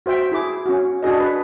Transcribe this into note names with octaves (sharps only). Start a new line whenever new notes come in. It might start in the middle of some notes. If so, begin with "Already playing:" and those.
F#4 C5 E5 G5
E4 G#4 D6
C#4 F#4
D4 F#4 G#4 D#5
B4